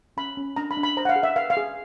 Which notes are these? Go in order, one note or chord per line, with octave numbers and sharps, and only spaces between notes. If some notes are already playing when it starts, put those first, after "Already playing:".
C#4 B5
C#4
D4 A#5
B5
D4
B5
C5 A#5
F#5
F5
G#4
E5
B4 F5
F5
G#4